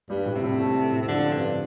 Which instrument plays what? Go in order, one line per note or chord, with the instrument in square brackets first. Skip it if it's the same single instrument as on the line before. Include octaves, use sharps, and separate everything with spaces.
[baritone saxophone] G2 [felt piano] G3
[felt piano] A2
[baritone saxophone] C3
[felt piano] A2
A3
A4
A2
[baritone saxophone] C3
[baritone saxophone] D3 [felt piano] F3
[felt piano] C4
[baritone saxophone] G2
[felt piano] D3